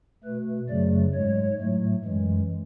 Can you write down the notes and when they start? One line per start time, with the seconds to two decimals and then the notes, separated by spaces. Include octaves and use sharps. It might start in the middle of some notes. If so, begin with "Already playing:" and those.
0.24 B2 A3 B4
0.69 F#2 C#3 F#3 A3 D5
1.14 G#2 G#3 C#5
1.59 A2 F#3 A3
2.05 F#2 E3 G#3